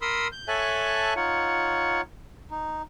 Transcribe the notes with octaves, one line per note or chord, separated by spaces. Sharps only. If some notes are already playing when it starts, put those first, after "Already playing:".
A#4 B5 C6 D#6 E6
G6
A4 C#5 E5 G#5 A5 F#6
D#4 F4 C#5 F#5
D#4